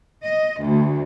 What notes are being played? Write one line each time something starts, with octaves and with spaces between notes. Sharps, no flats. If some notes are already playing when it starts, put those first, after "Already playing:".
D#5
D2